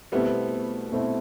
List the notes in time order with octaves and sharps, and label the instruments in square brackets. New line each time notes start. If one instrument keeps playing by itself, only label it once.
[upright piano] B2 A3 C4 E4 [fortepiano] G3 B3
[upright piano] B2 A3 C4 E4